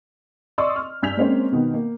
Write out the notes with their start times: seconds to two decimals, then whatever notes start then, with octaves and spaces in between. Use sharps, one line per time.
0.58 D5 D#5 C6 C#6 D#6 E6
0.76 F6
1.02 G2 G#5 E6 G6 B6 F7
1.17 G#3 A#3 C4 C#4 C5
1.52 B2 D#3 B3
1.74 A#3